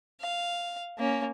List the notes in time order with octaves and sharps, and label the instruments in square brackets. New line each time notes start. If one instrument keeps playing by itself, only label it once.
[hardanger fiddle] F5
A#3 C#4